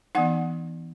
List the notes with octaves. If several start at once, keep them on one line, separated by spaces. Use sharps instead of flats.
E3 B3 D#4 F#5